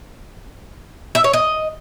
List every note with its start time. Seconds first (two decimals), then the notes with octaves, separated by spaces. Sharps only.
1.15 E5
1.24 C#5
1.33 D#5